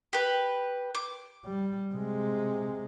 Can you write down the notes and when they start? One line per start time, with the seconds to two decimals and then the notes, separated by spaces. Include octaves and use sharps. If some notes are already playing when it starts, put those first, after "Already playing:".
0.13 G4 B4
0.95 D6
1.45 G3
1.94 C3 G#3